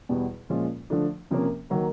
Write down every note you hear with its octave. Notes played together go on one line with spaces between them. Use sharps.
E2 B2 G3 B3
A#2 F3 G#3 C#4 F4
D3 F3 A3 D4
C3 F3 A#3 C#4
D#3 F#3 A#3